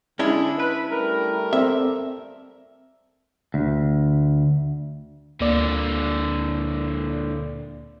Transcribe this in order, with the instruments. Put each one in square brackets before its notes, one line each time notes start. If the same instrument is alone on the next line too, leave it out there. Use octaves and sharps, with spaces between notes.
[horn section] D3 G#3 [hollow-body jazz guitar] C#4 D4 E4
[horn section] B4
G3 A3 A#4
[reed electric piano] C4 A4 D5 [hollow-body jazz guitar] E5
[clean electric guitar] D2
[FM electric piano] D2 A#3 D5 [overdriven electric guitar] A#2 D3